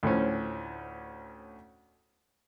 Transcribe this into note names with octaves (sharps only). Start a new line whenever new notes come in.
D2 A2 F3 C#4